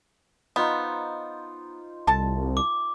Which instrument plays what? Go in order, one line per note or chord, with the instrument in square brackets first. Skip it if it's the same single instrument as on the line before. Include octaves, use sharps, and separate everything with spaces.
[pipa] B3 [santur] D#4 F4 C5
[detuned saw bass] C2 [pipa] A4 A5
[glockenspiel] D6